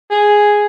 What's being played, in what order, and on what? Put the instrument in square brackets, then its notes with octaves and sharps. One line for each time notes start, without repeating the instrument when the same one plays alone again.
[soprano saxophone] G#4